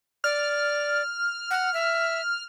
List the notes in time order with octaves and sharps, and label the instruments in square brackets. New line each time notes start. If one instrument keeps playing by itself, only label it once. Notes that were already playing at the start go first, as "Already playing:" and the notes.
[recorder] D5 [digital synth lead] F6
[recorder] F#5
E5